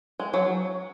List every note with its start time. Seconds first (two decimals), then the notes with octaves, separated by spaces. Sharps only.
0.20 G#3
0.34 F#3